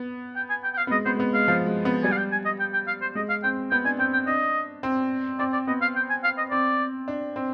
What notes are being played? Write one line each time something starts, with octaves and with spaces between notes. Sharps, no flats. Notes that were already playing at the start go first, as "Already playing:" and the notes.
Already playing: B3
G5
G#5
G5
G5
F5
B3
G#3 D#5
B3 C5
G#3
B3
G#3 F5
F3
G#3
B3
G3 G#5
F5
G5
G#5
D#5
G5
G5
F5
C5
G#3 D#5
F5
C4 G5
B3 G5
D4 G#5
C4 G5
G5
D4 D#5
C4
C4 D5
D5
B3 D#5
F5
G5
G#5
F5
D#5
C4 D5
D4
C4